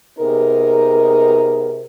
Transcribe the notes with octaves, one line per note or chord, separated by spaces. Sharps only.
C3 B3 D#4 G#4 A#4